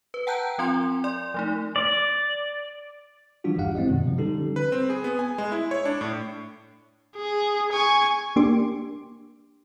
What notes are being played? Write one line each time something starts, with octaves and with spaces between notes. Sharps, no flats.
B4
F#5 G5 A5 A#5 F#6 G6
F3 C4 F4 C6
D5 C6
F3 A3 D#4
D5
E3 F3 G3 D4 F4 F#4
G1 E2 G2 G4 F5 F#5
G#3 C4 E4 D5 D#5
F#2 B2 D#3
C3 F3
D3 G3 C#4 D#4 G4 A4
B4
C4
G#4
B3
G#5
G#3
E4
C#5
D4
A2
G#4
G#5 C#6
A#3 D4 G4 C6 D6